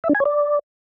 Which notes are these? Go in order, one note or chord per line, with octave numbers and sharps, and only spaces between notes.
E5
D4
G#5
C#5
D5